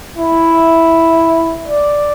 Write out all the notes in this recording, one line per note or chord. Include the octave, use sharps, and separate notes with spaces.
E4
D5